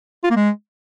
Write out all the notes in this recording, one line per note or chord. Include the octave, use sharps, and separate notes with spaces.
F4
A#3
G#3